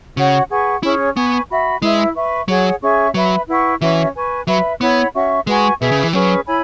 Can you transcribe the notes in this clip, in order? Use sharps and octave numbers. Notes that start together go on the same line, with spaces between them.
C#3 F#4 C#5 F#5
G#4 B4 F#5 C#6
C#4 E4 G#4 C#5
B3 B4 G#5 C#6
F#4 E5 B5
G#3 E4 B4 E5
B4 E5 C#6
F#3 G#4 C#5 F#5
C#4 G#4 E5 C#6
F#3 B4 E5 B5
E4 B4 F#5 C#6
E3 C#4 F#4 B4 E5
B4 G#5 C#6
F#3 B4 E5 B5
B3 E4 C#5 F#5 B5
C#4 F#4 E5 C#6
G#3 F#4 B4 G#5 C#6
B2 G#4 B4 E5
C#3
E3
F#3 C#4 G#4 B4
E4 C#5 G#5 B5